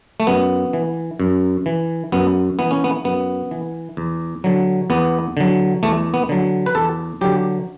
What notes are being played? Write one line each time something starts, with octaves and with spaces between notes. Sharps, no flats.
A3
F#2 B3
E3
F#2
E3
F#2 B3
E3 B3
C#4
B3
F#2 B3
E3
E2
D3 F#3
E2 B3
D3 F#3
E2 A3
B3
D3 F#3
B4
E2 A4
D3 F#3 G4